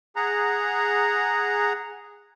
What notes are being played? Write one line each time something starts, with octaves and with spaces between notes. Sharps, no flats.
G#4 F#5 A#5